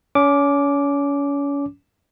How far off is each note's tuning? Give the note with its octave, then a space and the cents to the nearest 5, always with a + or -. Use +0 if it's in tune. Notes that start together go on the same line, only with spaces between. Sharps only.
C#4 +35 D6 -5